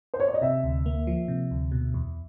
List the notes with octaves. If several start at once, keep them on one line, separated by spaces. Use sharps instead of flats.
C5
C#5
D5
D#5
C3 E5
D2
A#3
F3
C3
D2
B2
E2